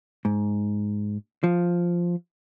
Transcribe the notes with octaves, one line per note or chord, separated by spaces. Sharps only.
G#2
F3